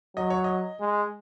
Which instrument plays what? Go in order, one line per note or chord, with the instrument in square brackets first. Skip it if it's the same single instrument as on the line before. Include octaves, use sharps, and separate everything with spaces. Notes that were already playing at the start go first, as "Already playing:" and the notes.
[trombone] F#3 [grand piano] D#5
[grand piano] C#5
D#5
[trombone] G#3